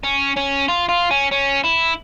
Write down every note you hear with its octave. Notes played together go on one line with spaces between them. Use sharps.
C#4
C#4
F4
F4
C#4
C#4
E4